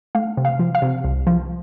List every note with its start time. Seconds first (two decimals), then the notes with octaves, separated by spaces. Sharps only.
0.15 A3 F5
0.37 C3
0.45 F5
0.59 F3
0.75 F5
0.82 C3
1.04 C2
1.27 F3